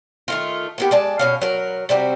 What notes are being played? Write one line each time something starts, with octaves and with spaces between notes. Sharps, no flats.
D#3 A3 F4
A#3 B3 G4
G#3 D5 A5
B2 C#4 F5
F#3 A#4
C3 G3 C4 F#4